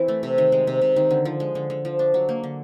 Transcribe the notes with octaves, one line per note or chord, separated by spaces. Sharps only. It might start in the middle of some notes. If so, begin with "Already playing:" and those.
Already playing: E3 C4
A3
C3
D#3
G#3
C3
C3
D#3
D3
F3
G#3
D3
D3
F3
D4
F#3
A#3
D3